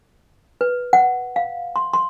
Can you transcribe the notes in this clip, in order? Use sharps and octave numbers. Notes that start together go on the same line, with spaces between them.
B4
F#5
F5
C6
C6